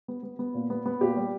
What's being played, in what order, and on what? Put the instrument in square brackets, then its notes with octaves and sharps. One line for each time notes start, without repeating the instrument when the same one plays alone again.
[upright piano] B3
B3
B3
A#2
B3
B3
[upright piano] A#2 [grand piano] G4
[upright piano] G3